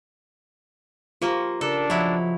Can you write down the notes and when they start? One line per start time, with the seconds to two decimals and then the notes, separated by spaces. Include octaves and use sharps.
1.22 F3 A#3 F4 G4 C#6
1.61 C#3 D4 A4 A#4
1.90 F3 F#3 E4 D#5 E5